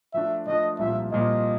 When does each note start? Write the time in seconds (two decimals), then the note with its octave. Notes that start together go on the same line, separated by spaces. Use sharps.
0.13 F3 A3 D4 E5
0.46 F3 A3 D4 D#5
0.79 C2 A#2 F3 A#3 E5
1.12 C2 A#2 F3 A#3 D#5